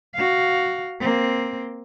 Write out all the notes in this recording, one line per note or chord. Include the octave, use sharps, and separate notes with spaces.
F#4 F5
A#3 C4